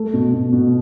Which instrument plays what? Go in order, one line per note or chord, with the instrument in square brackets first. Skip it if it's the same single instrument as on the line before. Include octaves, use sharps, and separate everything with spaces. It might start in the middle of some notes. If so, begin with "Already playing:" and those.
Already playing: [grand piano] A3
B2
B2
B2